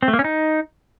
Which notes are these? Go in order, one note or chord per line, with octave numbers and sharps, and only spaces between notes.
C4
A3
A#3
C#4
D#4